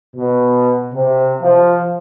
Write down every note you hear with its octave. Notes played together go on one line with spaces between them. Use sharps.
B2
C3
F3